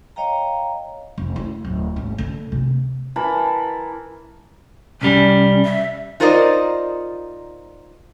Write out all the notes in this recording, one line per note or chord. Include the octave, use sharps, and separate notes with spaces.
C#5 D#5 F5 G5 A#5
F1
E4
D1
G#1
D3
C3
E3 A#4 A5 B5
C2 G3 C#4
E5
D#4 F4 A#4 C5 D5 D#5